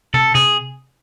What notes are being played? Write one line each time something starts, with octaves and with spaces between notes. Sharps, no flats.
C3 A4
C3 G#4